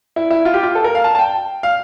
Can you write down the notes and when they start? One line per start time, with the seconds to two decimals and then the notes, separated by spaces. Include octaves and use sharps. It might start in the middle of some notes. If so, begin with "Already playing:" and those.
0.16 E4
0.30 E4
0.45 F4
0.54 G4
0.63 F4
0.75 A4
0.84 A#4
0.95 F5
1.04 A5
1.15 A5
1.19 G5
1.63 F5